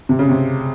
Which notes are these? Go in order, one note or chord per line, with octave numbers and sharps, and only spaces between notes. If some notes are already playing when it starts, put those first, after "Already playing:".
C3
C#3
C3